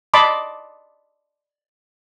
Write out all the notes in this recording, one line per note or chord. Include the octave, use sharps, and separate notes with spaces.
D5 D#5 A5 B5 C6 D6